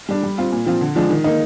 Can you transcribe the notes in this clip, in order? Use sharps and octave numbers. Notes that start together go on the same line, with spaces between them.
G3 D4
G3
C4 F4
A#2
F3 C4 F4
D3
F3 G#3 D4 F4
D#3
A#3 D#4